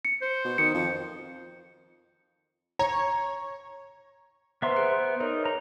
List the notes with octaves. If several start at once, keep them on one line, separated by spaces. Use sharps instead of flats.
C#7
C5
B2
D#3 C#7
F2
C#5 A#5
B3 B4 C5 E5 A#5 C6
G#4 F#6 C#7 D7
C5
D#4 G#4 A#4 C#5
C#5 A#5